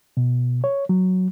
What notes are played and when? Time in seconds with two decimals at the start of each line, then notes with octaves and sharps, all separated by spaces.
0.17 B2
0.64 C#5
0.89 F#3